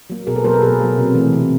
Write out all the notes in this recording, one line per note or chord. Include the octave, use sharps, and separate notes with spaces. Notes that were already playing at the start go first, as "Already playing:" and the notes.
F#3 A#3
B2 G#4 A#4
A4 B4
F#3 A#3 A#4 C5
A4 B4
B2 G#4 A#4
F#3 A#3
C3
E3 A3
C3